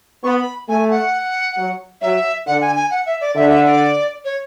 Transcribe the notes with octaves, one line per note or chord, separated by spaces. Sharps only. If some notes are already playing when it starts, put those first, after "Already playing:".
B3 B5 C#6
A3 G#5
F#5
F#3
F#3 E5
D3 F#5
G#5
G#5
F#5
E5
D5
D3 E5
E5
D5
C#5